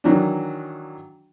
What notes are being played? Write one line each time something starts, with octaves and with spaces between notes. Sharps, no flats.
D#3 E3 F#3 D4